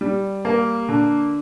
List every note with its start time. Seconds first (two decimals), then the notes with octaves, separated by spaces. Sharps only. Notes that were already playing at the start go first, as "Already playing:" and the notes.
0.01 G3
0.45 A#3
0.89 D3